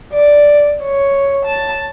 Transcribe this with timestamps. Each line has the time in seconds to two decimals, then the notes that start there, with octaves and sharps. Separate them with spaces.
0.13 D5
0.83 C#5
1.46 A5